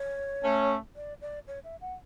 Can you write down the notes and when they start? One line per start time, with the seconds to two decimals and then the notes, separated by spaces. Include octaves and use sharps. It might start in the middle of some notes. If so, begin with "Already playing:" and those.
Already playing: C#5
0.44 A3 C#4
0.96 D5
1.21 D5
1.47 C#5
1.64 E5
1.81 F#5